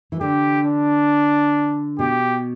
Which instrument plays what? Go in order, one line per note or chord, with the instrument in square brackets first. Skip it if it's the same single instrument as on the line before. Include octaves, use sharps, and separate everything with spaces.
[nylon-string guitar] E3
[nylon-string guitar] D3 [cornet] G4
[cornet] D4
[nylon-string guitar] B2 [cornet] G4